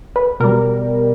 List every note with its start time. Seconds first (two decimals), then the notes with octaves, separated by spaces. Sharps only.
0.16 B4
0.40 B2 G3 A#4